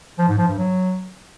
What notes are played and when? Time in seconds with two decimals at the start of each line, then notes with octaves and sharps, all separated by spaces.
0.18 F3
0.28 G#2
0.38 F3
0.48 G2
0.58 F#3